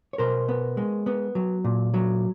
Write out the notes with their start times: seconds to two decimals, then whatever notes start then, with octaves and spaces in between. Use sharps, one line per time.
0.13 C#5
0.18 B2 A#4 C5
0.48 B3
0.77 G#3
1.06 B3
1.35 F#3
1.64 A#2
1.94 F#3